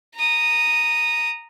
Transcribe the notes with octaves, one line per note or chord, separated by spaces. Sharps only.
A#5 D#6